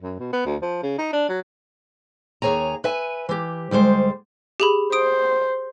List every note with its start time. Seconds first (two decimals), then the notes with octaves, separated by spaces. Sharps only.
0.02 F#2
0.19 B2
0.33 B3
0.46 D2
0.62 F3
0.82 C#3
0.98 D#4
1.13 D4
1.29 F#3
2.42 D#2 G#4 C#5 G#5 A#5
2.84 B4 E5 G#5
3.29 E3 G4
3.71 D2 G3 G#3 C5
4.60 G4 G#4 B5
4.92 C5 D#6 D7